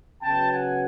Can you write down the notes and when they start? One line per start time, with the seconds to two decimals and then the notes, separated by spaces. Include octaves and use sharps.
0.22 C#3 F#3 B3 G5 A5
0.51 F#5 G#5